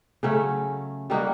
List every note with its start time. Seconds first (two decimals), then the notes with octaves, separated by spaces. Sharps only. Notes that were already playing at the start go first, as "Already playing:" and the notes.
0.23 C#3 F#3 A3 C#4
1.10 G3 A#3 D#4 F#4